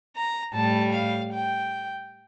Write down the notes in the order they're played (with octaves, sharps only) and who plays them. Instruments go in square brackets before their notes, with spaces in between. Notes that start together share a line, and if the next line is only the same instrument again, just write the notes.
[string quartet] A#5
A2 G3 A5
F5
G5